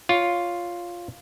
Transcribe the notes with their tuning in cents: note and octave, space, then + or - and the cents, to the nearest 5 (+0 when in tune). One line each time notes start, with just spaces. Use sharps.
F4 +0 C#5 +10